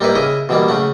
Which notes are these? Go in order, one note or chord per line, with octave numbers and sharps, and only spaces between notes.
G3 A#3 D#4 E4 B4
C#3 E4 D#5
B2 E3 G3 A#3
C#3 A3 F#5